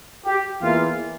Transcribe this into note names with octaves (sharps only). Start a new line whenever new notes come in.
G4
E2 E3 A#3 E4 F4